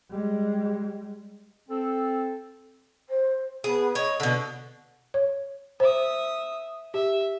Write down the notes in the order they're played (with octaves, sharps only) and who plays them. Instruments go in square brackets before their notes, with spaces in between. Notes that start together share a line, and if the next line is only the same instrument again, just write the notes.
[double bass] G3 G#3
[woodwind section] C4 A4
[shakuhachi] C5
[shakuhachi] B3 [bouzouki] G#4
[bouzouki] C#5 [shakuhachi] D#5
[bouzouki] B2 D3
[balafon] C#5
[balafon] C5 [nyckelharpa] E5 D#6
[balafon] G4 [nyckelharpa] E5